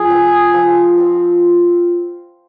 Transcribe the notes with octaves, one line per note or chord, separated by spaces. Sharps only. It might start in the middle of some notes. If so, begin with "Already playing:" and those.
Already playing: F3 G#4
C4 F4
F3
C4 F4